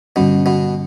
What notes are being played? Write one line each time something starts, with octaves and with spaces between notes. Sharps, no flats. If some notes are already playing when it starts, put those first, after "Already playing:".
G2 B2 D3 G3 C#4
B2